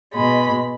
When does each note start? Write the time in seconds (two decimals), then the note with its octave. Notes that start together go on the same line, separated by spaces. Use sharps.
0.14 B2 G#3 B5